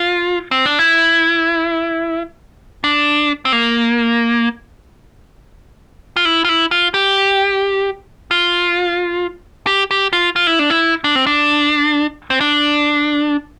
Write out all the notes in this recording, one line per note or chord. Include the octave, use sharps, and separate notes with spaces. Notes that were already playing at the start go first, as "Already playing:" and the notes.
Already playing: F4
C4
D4
E4
D4
C4
A#3
F4
E4
F4
E4
F4
G4
F4
G4
G4
F4
F4
E4
D4
E4
D4
C4
D4
C4
D4